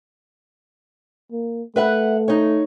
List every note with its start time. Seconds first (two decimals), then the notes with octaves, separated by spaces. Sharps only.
1.32 A#3
1.76 A3 B4 E5 F#5
2.28 D#4 C#5